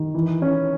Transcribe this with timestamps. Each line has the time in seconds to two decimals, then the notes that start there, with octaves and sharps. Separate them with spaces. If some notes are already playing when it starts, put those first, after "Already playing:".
Already playing: D#3
0.14 E3
0.42 C#4